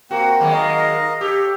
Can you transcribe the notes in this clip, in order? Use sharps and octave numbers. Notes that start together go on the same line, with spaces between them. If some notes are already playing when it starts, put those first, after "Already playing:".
A#3 C4 F#4
D#3 F#3 G#3
A#4 D#5 F5
G4 A4 C#5